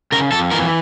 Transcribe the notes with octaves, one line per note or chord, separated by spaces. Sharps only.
C#3 A#4
F2 A4
E3 A#4